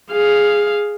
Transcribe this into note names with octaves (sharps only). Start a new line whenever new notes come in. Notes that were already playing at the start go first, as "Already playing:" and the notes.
G#4 F5